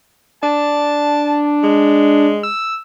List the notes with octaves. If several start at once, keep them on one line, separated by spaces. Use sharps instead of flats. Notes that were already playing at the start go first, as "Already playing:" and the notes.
D4 A5
G#3
E6